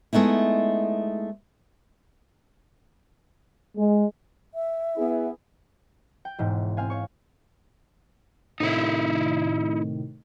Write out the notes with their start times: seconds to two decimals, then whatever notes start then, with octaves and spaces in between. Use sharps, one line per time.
0.13 G#3 A3 B3 D#4 E4
3.77 G#3
4.54 E5
4.97 B3 E4 G#4
6.25 G5
6.39 E1 G#2
6.77 C4 F5 G#5
6.90 C#5 C#6
8.60 A2 C3 D#3 D#4 E4